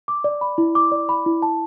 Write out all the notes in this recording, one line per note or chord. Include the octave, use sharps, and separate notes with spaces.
D6
D5
B5
E4
D6
D5
B5
E4
A5